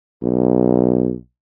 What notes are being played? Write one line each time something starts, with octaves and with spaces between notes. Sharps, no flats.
B1